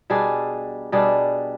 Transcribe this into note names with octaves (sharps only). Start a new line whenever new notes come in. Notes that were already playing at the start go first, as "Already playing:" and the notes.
B2 G3 D4 G#4
B2 G3 D4 G#4